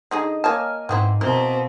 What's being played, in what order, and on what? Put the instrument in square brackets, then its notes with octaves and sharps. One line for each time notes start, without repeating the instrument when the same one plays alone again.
[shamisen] D3 D#4 G#4 [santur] D#5
[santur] A#3 G#5 [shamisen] C#5 D#5 A5 [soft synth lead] F6
[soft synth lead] G#2 [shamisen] B3 C4 E4
[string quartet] B2 C4 [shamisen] E4 A#4 [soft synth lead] A#5